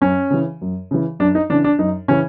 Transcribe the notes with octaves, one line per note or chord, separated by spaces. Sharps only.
F#2 C#4
C#3 E3
F#2
C#3 E3
F#2 D4
D#4
C#3 E3 D4
D4
F#2 D#4
C#3 E3 C#4